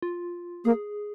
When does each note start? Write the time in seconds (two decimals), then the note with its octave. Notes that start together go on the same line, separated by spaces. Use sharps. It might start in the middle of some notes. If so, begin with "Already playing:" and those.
0.02 F4
0.65 A#3 G#4